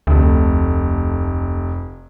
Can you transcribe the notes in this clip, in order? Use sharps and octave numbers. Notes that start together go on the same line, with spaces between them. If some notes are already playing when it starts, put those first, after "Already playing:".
F1 D2 A3